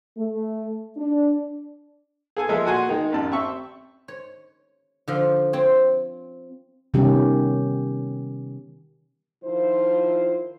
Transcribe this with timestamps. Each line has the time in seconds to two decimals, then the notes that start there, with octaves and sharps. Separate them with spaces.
0.17 A3
0.97 D4
2.37 G#4 A4 G#5
2.49 F3 G#3 A#3 G#4 A4 E5
2.66 A#2 F#4 F#5 G#5 C6
2.89 D#3 G#3 D#4
3.12 A1 F#2 A5
3.32 C4 E5 C#6
4.08 C#5
5.08 D3 F3
5.53 C4 C#5
6.94 C3 D#3 G3 B3 C#4 G4
9.44 D#3 F3 E4 F4 C5